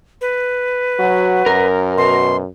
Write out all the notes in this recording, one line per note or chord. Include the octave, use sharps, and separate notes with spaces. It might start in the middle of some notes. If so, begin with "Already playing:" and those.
B4
F#3 F#4
F#2 A#4
B2 C6